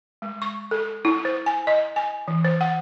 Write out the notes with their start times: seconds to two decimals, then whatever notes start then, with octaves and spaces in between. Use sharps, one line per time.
0.22 G#3
0.42 C#6
0.71 A4
1.05 E4
1.25 C5
1.46 G#5
1.67 D#5
1.96 G#5
2.28 E3
2.45 C5
2.61 F#5